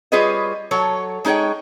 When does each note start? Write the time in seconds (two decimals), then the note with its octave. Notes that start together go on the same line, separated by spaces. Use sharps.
0.12 G3 F4 G#4 B4 C#5 D#5
0.71 F#3 A4 C#5
1.25 G#3 D#4 G#4 C#5 G5